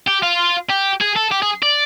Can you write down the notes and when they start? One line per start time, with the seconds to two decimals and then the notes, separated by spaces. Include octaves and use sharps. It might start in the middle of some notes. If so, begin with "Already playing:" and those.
0.08 G4
0.23 F4
0.70 G4
1.01 G#4
1.16 A4
1.32 G4
1.43 G#4
1.63 D5